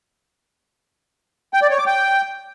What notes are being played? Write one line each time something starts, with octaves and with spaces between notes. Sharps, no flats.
G5
D5
C#5
D6
G5